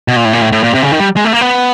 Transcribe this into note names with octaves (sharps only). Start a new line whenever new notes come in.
B2
A#2
A2
A#2
A2
A2
A#2
C3
C#3
D#3
G3
G#3
A3
A#3
B3